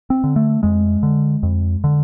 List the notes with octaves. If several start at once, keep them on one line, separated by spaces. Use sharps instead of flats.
C4
D3
A3
F2 G#3
D3
F2
D3